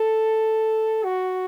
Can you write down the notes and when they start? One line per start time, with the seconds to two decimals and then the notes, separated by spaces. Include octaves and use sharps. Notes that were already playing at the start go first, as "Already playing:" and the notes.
Already playing: A4
1.04 F#4